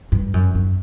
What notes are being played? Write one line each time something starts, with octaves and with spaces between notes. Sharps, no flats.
G2
F#2
F#2